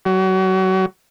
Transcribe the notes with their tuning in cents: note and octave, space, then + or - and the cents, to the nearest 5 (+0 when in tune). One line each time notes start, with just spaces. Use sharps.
F#3 +30